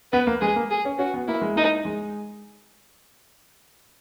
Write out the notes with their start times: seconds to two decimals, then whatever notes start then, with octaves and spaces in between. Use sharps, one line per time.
0.12 B3 B4
0.27 A#3
0.41 G#3 G#4
0.56 A#3
0.71 G#4
0.85 C#4
0.98 C#4 F#4
1.14 B3
1.27 A#3 E4
1.42 G#3
1.55 A#3 D#4
1.85 G#3